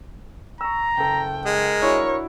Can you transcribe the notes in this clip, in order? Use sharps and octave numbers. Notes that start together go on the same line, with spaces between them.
A#5 C#6 E6
F#1 A4 G5
G#3 A#4
D4 E4 F#4 C#5